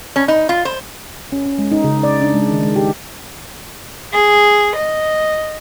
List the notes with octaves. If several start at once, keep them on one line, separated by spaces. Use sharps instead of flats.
C#4
D#4
F4
C5
C#4
C#4
G#3
D#4
C#3
D5
D4
G#3
D#3
G#3
G4
G#4
D#5